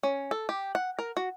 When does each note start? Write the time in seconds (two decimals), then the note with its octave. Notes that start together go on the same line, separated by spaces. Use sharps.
0.03 C#4
0.31 A4
0.49 G4
0.75 F#5
0.99 A#4
1.17 F#4